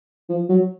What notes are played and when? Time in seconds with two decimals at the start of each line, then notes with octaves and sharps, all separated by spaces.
0.29 F3
0.49 F#3